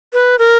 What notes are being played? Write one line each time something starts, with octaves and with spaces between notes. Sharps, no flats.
B4
A#4